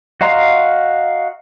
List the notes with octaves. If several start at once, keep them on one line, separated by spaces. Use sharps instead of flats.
F#4 D#5 F5 A#5 C6